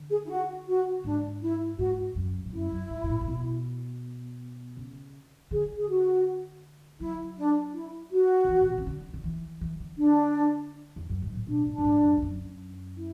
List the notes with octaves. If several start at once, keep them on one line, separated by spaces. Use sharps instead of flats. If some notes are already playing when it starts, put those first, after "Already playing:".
Already playing: D3
G#4
E4
F#4
F#4
G#2 D4
E4
G#2 F#4
F#2
G#2
F#2 E4
F#2
G#2
G#2
A2
A2
B2
C#3
D3 G#4
G#4
F#4
F#3 E4
D4
E4
F#4
D3
E3
A2
B2
C#3
D3
D3
E3
E3
D3
D4
E2
F#2
G#2
A2
B2 D4
G#2
D4
F#2
G#2
F#2
E2
F#2
E4